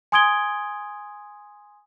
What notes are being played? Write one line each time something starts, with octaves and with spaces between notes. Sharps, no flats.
G#5 C6 D#6 G#6 D7 G7